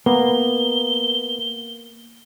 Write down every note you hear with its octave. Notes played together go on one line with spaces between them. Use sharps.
A#3 B3 G7